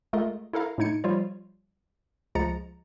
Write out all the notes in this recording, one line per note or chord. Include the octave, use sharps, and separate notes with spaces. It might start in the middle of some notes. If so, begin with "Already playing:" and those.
G#3 A3 F4 A#4 D#5
E4 A4 A#4 F5 A#5
A2 A3 D#4 G#6 C#7
F3 G3 F4 C5 C#5
C#2 F3 G#3 A#5 A6 C#7